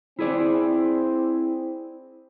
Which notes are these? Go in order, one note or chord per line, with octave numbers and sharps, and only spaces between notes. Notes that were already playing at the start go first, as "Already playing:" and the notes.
C4 E4 G#4 D5